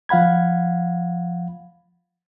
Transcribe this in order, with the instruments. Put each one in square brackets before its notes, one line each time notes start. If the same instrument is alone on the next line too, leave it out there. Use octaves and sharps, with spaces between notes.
[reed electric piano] F3 F5 F#5 B5 G#6